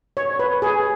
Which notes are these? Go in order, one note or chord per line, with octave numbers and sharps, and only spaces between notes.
C#5
B4
G#4